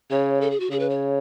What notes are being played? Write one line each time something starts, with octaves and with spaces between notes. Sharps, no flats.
C#3 C#5
A4
G#4
F#4
C#3 G#4
B4
C#5